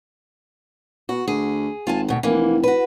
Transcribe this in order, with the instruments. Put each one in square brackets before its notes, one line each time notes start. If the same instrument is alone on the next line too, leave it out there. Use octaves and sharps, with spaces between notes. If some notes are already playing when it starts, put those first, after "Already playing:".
[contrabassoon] B2 [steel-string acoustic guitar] F#4
[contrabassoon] D2 [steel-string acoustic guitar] G#4
[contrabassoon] G#1 [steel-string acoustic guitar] F4 G#5 A5
[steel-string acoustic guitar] D2 B2
[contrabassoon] F1 [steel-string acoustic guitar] E3 A#3
[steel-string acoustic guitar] F#4 B4